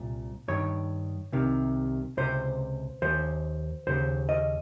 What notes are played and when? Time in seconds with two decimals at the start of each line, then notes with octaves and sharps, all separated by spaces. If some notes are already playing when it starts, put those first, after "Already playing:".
Already playing: C2 A#2
0.48 G2 D#3 C#5
1.32 C2 C3 D#3
2.17 C#2 C3 C5
3.02 D#2 D#3 C5
3.87 D#2 C#3 C5
4.29 D#5